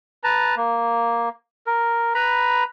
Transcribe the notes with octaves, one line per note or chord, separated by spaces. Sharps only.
B4 A5 A#5
A#3
A#4
B4 A#5 B5